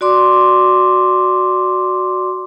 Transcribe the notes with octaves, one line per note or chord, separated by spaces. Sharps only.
F#4 D5 C6 D6